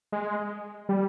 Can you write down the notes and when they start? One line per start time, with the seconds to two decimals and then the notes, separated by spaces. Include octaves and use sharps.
0.12 G#3
0.89 G3